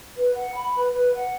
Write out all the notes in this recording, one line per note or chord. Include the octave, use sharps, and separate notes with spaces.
B4
F#5
B5
B4
B4
F#5